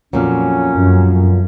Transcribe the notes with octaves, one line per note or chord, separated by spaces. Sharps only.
F2 A#2 F#3 C#4
F#2